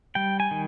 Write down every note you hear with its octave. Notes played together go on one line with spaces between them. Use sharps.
G3 G5
G#5
D#3